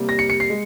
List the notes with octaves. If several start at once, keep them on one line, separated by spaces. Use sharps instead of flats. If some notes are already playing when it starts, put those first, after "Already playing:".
Already playing: C3 G3 A#3
A#6
C#7
C#7
C7
G#3